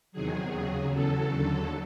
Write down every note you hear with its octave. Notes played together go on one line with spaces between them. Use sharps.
E2 C3 D#3 F#3 G#4
D#2 C#3 F#3
E2 C#3 F#3 A4
D#2 D3 F#3 A4